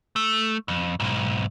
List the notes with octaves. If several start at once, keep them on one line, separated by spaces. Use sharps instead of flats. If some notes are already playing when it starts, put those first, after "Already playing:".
A3
F2
B1 G#2